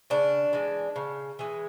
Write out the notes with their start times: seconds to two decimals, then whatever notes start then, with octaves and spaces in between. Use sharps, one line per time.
0.10 C#3 D4
0.53 E3 G#3
0.96 C#3
1.39 E3 G#3